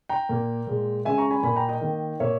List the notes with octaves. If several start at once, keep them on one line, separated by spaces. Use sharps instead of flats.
G5 A#5
A#2 A#3
A#2 G#3
C#3 G#3 E5 G#5
A#5 C#6
G#5 B5
A#2 A#3 G#5 B5
G5 A#5
D#5 G5
D#3 A#3
A#2 A#3 C#5 E5